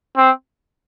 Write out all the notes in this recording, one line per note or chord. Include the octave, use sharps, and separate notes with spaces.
C4